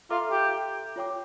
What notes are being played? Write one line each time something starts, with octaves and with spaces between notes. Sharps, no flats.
F4 A4 E5 A#5 D6
G4
F4 C#5 G5 D6